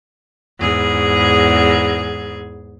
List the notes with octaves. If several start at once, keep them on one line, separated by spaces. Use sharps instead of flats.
E2 G#2 G#4